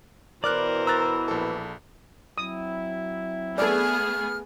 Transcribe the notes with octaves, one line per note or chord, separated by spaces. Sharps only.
B2 E3 A#4 C5 D5 D6 F6 F#6
A#5 E6 F#6 A6
A#1 A4
F#3 C4 E4 D#6
A3 B3 G#4 A4 D5 F6